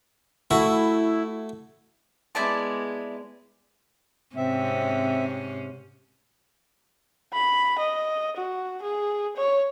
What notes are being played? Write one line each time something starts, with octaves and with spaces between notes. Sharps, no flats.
A3 E4 F#4
G#3 B3 E4 D5 A5
G#2 C3 C4 C#4 E5
B5
D#5
F#4
G#4
C#5